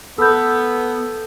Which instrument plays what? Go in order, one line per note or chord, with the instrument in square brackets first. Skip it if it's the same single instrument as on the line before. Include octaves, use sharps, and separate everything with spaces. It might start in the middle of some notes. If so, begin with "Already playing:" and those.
[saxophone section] B3 [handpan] A4 [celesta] E6 G6